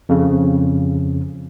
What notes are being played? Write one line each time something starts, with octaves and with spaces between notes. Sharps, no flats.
F2 C#3